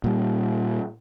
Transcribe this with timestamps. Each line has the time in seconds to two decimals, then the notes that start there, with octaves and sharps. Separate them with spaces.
0.04 A#2 G3